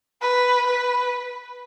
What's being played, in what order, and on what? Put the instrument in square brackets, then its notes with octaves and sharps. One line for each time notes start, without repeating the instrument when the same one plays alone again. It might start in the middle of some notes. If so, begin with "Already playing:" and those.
[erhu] B4
B4